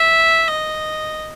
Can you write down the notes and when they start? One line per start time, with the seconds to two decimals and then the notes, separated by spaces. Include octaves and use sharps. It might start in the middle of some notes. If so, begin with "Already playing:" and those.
Already playing: E5
0.48 D#5